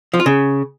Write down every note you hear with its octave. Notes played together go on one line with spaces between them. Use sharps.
F3
F4
C#3